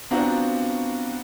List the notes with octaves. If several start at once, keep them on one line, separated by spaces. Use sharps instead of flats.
B3 C4 D4 F4 F#4 A#5